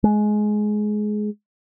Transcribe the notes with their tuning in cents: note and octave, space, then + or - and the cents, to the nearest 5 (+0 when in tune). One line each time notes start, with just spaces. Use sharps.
G#3 +20